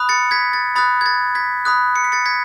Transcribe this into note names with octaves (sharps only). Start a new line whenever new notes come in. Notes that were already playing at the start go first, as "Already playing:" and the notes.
Already playing: B5 D#6 F#6
A6 C#7
G#6 B6
A6
B5 D#6 F#6 A6
G#6
A6
G#6 B6
B5 D#6 F#6
C#7
B6
A6 C#7
G#6 B6